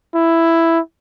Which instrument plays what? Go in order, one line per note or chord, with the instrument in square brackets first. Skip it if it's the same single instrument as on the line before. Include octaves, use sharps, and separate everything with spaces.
[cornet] E4